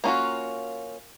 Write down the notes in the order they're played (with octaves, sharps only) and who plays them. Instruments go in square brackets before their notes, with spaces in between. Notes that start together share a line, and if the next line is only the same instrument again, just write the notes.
[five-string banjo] A#3 C#4 F4 F#4